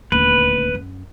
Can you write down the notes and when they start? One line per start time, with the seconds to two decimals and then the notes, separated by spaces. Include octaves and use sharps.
0.12 D#1 D2 B4
0.75 F#2